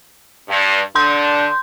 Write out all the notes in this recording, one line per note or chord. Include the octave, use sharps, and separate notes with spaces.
G2
D3 D4 C6 G6